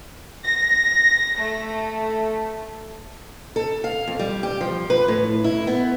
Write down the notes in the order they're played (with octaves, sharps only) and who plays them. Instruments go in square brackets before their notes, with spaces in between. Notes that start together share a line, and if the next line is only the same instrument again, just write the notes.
[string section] A#6
A3
[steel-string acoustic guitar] A4
F5
F2
G3
G4
F3
B4
A2
E4
B3